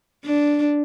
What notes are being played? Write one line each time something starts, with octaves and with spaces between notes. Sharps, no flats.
D4